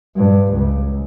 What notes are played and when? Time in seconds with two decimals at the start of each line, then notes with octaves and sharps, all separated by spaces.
0.16 G2
0.53 C#2